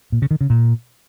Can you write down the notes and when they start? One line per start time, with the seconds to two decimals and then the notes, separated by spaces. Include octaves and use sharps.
0.12 A#2
0.22 C#3
0.31 D#3
0.41 C#3
0.50 A#2